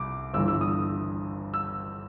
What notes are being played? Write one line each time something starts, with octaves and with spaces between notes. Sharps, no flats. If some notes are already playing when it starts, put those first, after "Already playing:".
Already playing: C2 D6
G1 G2 E3 E6
E6
D#6
E6